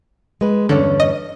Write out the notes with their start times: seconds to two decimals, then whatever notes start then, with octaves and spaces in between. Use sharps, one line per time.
0.41 G#3 B4
0.69 E2 G2 D3 C#4
1.00 D#5